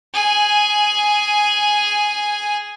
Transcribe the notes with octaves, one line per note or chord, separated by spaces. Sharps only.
G#4 G#5